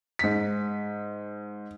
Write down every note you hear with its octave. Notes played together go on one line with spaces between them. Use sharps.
G#2 B6